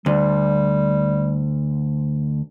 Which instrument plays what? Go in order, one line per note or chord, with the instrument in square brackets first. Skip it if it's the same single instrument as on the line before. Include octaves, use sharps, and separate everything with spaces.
[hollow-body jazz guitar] D2 [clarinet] G3